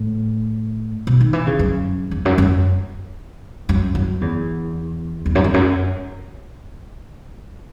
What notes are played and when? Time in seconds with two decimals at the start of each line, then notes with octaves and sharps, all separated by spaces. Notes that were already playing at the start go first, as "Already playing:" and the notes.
Already playing: A2
1.07 B2
1.21 D#3
1.33 E3
1.47 C#3
1.59 F#2
2.11 E2
2.25 F#2
2.38 F#2
3.69 F#2
3.95 F#2
4.21 E2
5.26 E2
5.35 F#2
5.44 E2
5.54 F#2